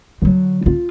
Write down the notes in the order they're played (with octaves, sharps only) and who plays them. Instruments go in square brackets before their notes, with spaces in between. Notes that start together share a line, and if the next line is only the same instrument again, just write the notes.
[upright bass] D3 F#3
F4